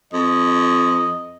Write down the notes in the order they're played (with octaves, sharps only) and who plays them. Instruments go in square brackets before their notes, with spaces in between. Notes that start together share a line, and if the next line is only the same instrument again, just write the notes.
[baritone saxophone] F2 [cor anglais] D#5